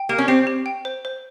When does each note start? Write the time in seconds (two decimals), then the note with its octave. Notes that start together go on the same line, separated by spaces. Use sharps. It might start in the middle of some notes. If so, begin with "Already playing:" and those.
Already playing: G5
0.09 A#3 G4
0.18 C#4
0.28 C4 G4
0.47 G4
0.66 G5
0.85 C5
1.05 C5